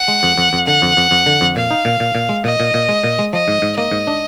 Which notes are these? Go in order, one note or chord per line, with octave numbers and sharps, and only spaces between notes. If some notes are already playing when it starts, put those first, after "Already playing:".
Already playing: F#5
G#3
F2
F2
F2
D3 F#5
F2
F2
F2
D3
F2
A#2 F5
D#4
A#2
A#2
A#2
G#3
A#2 D#5
A#2
A#2
G#3
A#2
G#3
F3 D#5
G#2
G#2
A#3 D#5
G#2
D4